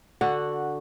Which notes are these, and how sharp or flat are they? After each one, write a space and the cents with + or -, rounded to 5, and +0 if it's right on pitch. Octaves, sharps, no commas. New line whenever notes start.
D3 +0 F#4 -5 F#5 +0